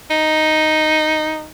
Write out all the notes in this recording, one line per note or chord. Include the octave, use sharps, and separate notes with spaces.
D#4